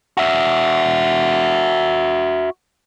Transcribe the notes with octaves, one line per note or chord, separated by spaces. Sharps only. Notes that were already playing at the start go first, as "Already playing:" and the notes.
F#4 E5